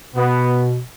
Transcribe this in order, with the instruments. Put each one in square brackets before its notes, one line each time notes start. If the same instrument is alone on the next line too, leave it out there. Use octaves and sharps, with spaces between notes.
[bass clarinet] B2 [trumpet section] B3